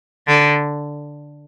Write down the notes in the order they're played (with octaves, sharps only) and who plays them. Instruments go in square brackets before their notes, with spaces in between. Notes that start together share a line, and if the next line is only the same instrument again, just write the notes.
[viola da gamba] D3